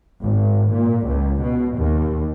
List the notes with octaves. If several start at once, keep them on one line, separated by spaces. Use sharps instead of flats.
G#1
A#2
C#2
B2
D#2